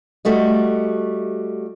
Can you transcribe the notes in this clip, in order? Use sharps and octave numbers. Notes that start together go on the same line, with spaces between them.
G3 A3 F#4 D#5